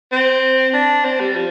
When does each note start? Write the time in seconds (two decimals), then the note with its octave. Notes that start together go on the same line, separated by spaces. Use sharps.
0.12 C4
0.74 D4
1.04 C4
1.20 G3
1.35 F3